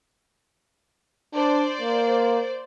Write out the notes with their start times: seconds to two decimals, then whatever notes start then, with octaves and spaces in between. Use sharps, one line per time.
1.35 D4 C5 D5
1.81 A#3